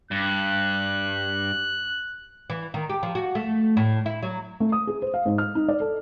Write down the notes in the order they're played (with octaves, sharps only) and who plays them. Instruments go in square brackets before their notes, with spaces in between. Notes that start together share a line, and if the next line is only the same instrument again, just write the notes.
[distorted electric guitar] G2 [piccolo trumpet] F#6
[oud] E3
D#3
G4
F3
F#4
A3
A2
E4
F#3
[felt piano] A3
D#6
G#4
C5
F5
G#2
F6
D#4
D5
A4